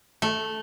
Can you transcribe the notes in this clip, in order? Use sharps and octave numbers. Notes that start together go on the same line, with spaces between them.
A3